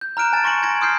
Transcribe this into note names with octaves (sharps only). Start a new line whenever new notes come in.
G6
A#5 F6 F#6 D7 E7
G#5 A5 A6 D7
C6 C#6 A#6 C#7 D7 F#7
C6 G#6 A#6 D7
C6 D#6 F6 G6 C7 D7